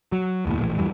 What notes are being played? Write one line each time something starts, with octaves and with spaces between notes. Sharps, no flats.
F#3
F1 D#2 A2
A#1 A2 D3 E3
E2 G2 E3 G3